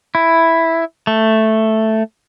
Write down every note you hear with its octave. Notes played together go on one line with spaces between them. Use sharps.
E4
A3